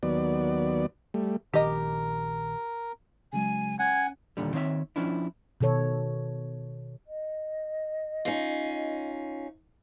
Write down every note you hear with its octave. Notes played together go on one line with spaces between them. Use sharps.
D#2 F#3 B3 D5
G3 A3
A#1 D#3 G4 A#4 D#5
C#3 F#3 G#3 G#5
C#4 F#5 G#5 G#6
D#2 A#2 D3 G3
D#3 C4 C#5 D5 E5
F3 C#4 D4 E4
B2 D#3 A4 C#5
D#5
C#4 D#4 F4